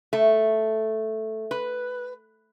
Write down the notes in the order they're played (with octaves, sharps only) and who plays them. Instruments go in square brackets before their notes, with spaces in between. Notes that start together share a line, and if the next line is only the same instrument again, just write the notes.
[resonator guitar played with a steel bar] A3
B4